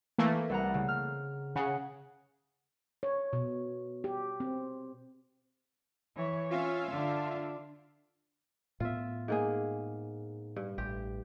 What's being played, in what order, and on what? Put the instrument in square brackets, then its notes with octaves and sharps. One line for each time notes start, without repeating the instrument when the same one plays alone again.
[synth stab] E3 A3 A#3
[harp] C2 F#5 A#5
C#3
F6
[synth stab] C#3 [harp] G#4 F#5
[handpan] C#5
B2
G4
C4
[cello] E3 C#5
[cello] C#4 [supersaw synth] F4 E5 F5
[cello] D3 D4
[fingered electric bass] A2 B3 [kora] F4 E5
[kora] G#2 A#3 G#4
G2
[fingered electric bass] A1 [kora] G4